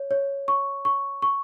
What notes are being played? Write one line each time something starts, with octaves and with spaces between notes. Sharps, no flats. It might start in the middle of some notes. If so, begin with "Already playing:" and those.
Already playing: C#5
C#5
C#6
C#6
C#6